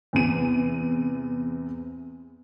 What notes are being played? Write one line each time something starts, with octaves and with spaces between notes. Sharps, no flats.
E2 C3 D#7